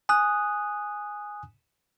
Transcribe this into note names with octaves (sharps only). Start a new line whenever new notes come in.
G#5 D#6 F#6